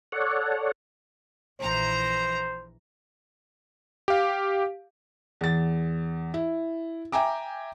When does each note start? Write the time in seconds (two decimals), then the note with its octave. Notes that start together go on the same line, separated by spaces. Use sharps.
0.12 A4 C#5 D5 F#5
1.61 A#1 E3 C5 A#5
4.08 G4 F5
5.41 E2 A6
6.34 E4
7.12 E5 G5 G#5 A#5 D6